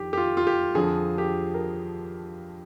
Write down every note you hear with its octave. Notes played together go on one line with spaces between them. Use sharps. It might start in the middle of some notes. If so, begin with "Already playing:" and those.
Already playing: F2 D#3 G4
G4
F4
F4
G4
F2 D3 F3 G#4
G4
A#4